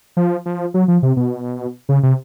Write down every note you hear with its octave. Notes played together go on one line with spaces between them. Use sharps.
F3
F3
F#3
F3
C3
B2
C#3
C3